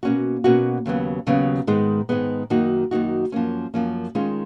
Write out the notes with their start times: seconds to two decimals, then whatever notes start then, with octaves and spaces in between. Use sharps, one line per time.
0.03 B2 A#3 C#4 F#4
0.44 B2 A#3 C#4 F#4
0.86 D#2 C#3 F#3 B3
1.27 D#2 C#3 F#3 B3
1.67 G#2 D#3 G#3 B3
2.09 G#2 D#3 G#3 B3
2.50 F#2 D#3 A#3 D#4 F#4
2.91 F#2 D#3 A#3 D#4 F#4
3.32 F#2 F3 A#3 C#4
3.74 F#2 F3 A#3 C#4
4.15 D#3 G#3 C#4 F4